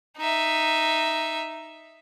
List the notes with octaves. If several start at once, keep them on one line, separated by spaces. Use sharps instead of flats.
D#4 E5